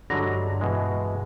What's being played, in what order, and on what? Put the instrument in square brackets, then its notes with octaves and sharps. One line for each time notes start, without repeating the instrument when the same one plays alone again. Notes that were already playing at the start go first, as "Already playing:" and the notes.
[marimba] G2 [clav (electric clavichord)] D3 F#3 G#3
[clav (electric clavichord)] B2 E3 G#3